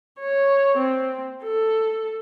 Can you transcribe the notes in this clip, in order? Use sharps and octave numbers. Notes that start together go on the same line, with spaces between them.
C#5
C4
A4